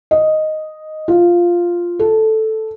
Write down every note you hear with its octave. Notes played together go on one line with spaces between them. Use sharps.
D#5
F4
A4